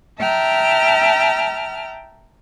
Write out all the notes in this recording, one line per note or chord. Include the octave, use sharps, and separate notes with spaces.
E5 G5 A5 A#5 F6